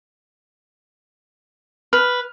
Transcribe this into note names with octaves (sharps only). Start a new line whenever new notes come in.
B4 F6